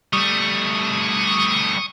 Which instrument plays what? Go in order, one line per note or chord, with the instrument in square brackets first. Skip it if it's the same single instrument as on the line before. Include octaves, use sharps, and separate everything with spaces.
[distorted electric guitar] G3 A3 [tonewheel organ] C#6 D#6